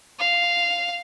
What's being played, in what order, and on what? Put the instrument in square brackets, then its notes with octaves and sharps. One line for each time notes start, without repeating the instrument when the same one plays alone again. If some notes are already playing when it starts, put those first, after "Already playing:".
[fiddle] F5